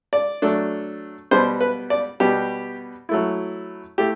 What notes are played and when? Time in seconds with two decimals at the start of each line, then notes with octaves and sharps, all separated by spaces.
0.13 D5
0.42 F#3 A3 D4
1.31 B2 G3 B3 C5
1.60 B4
1.90 D5
2.20 B2 G3 B3 G4
3.09 F#3 A3 E4
3.98 A3 E4 G4